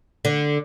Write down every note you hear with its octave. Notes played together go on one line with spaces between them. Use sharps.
D3